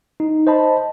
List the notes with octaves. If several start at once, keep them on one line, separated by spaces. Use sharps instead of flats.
D#4
C5 D#5 A5 B5